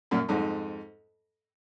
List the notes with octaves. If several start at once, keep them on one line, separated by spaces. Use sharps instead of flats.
F#2 A#2
F2 G#2